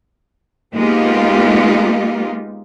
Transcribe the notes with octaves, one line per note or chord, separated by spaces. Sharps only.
G#3 A#3 B3 D#4 F4 G4